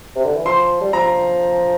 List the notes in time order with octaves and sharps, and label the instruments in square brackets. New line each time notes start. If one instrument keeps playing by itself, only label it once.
[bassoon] C3
D3
E3
[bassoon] F3 [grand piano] C6
[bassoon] G3
[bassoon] F3 [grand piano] A#5